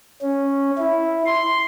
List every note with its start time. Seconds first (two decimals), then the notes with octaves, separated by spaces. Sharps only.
0.22 C#4
0.78 E4
1.26 C6